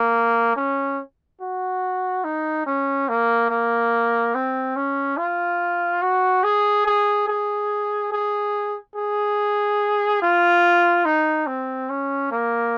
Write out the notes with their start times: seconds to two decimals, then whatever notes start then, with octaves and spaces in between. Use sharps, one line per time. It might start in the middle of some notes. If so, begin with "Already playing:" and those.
Already playing: A#3
0.56 C#4
1.41 F#4
2.24 D#4
2.66 C#4
3.09 A#3
3.50 A#3
4.34 C4
4.76 C#4
5.17 F4
6.02 F#4
6.44 G#4
6.86 G#4
7.28 G#4
8.12 G#4
8.96 G#4
10.22 F4
11.05 D#4
11.47 C4
11.90 C#4
12.32 A#3